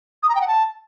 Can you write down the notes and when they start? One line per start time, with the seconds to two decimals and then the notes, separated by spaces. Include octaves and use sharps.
0.23 D#6
0.29 A#5
0.35 G5
0.41 F#5
0.47 A5